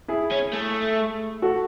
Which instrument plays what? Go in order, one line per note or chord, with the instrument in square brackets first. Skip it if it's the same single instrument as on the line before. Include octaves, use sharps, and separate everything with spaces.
[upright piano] E4 G#4
[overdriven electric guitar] C#4
A3
[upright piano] F#4 A4